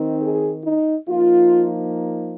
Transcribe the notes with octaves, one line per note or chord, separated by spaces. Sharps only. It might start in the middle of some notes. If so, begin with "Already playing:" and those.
Already playing: D#3 C4 D#4
G#4
D#4
F3 A#3 D#4 F4